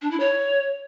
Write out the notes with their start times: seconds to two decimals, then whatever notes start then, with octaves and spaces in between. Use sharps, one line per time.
0.02 D4
0.11 E4
0.20 C#5